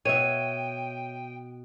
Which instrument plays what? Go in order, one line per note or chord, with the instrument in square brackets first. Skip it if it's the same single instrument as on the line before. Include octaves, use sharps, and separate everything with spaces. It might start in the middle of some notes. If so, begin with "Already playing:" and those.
[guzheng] B2 [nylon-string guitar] C#5 E5 [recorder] G5 [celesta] D#7